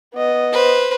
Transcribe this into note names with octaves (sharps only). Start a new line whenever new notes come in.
B3 D#5
B4 C5